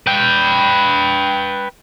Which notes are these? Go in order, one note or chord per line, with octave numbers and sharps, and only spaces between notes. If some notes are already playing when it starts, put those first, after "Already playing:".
B4 G5